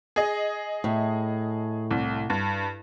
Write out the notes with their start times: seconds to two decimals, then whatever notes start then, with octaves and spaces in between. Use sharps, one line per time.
0.16 G#4 D#5
0.84 A2
1.91 C2
2.30 G2